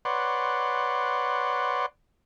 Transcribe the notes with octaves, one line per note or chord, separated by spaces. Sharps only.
B4 C#5 D5 F#5 C6